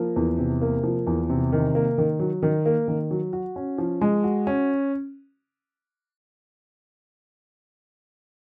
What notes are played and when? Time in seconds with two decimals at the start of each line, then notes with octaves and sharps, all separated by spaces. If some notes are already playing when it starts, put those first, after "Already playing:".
Already playing: F3 A#3
0.16 E2
0.38 C3
0.62 A#3
0.84 F3
1.07 E2
1.30 C3
1.52 D#3
1.75 A#3
1.98 D#3
2.19 F#3
2.43 D#3
2.66 A#3
2.88 D#3
3.11 F#3
3.33 F#4
3.56 C#4
3.78 F3
4.01 G#3
4.24 F#4
4.47 C#4